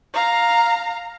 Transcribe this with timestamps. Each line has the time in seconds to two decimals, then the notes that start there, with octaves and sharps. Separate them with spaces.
0.13 F5 A#5